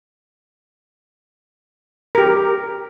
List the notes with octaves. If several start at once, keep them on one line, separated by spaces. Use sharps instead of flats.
G4 A#4